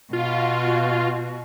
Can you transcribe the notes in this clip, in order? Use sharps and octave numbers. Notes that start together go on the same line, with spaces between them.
B2 F4 F#4